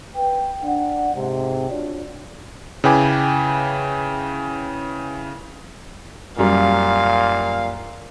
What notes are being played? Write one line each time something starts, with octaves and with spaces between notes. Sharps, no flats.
B4 G5
D4 F#5
G#2 C3
D4 F4 F#4 C#5 D5
C#3 E4 B4 G5 G#5 D6
F#2 A#2 G3 F5